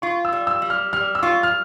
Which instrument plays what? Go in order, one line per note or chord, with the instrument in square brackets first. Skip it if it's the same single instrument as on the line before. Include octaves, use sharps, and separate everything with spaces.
[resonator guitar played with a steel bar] F4 [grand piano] C#6
[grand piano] E6
[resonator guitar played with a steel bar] G3
[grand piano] E6
[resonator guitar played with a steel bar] G3
[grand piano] F6
[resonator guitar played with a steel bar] G3 [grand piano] F6
[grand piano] E6
[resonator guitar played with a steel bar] F4 [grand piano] C#6
[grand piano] F6